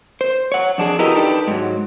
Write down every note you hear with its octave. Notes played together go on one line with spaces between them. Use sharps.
C5
C#5 F#5
F2 D4 G#4
E4 F#4 G4 A#4 B4 D#5
D4 D#4 G4 A4 B4
G#2 F#3